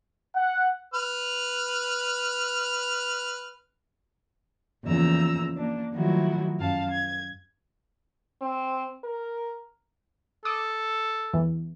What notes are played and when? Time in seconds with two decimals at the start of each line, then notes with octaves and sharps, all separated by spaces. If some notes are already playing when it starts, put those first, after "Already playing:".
0.35 F#5
0.94 B4 F6
4.83 E2 C#3 F3 A#3 A#5 E6
5.56 A#3 D4
5.92 D#3 F3 F#3 A3 E4 F#4
6.58 F#2 F5 A5
6.90 G#6
8.41 C4
9.04 A#4
10.45 A4 D6 D#6
11.34 E2 E3